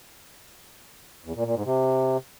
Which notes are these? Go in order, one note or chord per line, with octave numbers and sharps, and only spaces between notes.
E2
A#2
A#2
G#2
C3